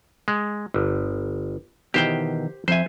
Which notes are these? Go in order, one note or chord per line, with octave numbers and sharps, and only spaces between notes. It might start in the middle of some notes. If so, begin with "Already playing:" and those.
G#3
G1
B2 D#3 E3 G4 C5 G5
F2 C5 E5 G#5